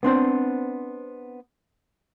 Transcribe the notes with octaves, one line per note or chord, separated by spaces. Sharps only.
B3 C4 D4 C5